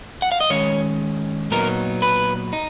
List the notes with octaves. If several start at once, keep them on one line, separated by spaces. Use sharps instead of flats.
F#5
F5
D#5
D#3 G#3 C#4 C#5
A#2 F#3 B3 D#4 A#4
B4
D#4